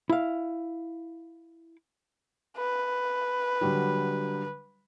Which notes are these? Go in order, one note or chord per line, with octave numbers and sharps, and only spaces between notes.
E4 F5
B4
D3 F#3 G3